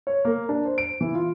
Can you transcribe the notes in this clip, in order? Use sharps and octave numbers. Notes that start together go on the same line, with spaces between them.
C#5
A#3
D4
C5
D7
E3
F4